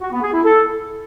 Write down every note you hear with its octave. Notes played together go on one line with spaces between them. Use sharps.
F#4
B3
G#4
E4
A4